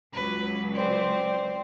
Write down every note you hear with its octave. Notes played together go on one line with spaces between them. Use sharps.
C#2 F#3 B4
C4 C5 D5